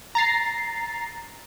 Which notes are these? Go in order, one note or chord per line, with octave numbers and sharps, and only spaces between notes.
A#5 A6 C7